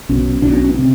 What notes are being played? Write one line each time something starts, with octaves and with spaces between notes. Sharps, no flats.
B1 B2 C#4
B1 B2 D4
C#4
C#4
C3 C4